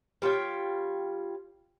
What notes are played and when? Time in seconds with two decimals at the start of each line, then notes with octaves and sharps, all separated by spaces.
0.22 G3 F4 C#5 G5